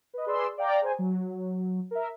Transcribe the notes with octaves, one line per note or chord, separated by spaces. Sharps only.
B4 D#5
G#4 B4 D5 C6 E6
D5 F5 G5 A#5
G#4 C5 G#5
F#3
A#4 E5